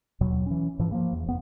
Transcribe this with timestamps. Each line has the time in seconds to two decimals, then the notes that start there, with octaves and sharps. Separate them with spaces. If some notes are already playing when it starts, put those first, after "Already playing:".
0.21 D#2 B2 F#3
0.46 E3 C#4
0.79 G#2 E3 F3
0.92 F3 A#3
1.13 E2
1.26 F1 B3